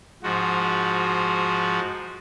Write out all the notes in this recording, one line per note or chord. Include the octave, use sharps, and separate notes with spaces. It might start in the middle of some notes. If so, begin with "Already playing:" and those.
G#2 F3 F#4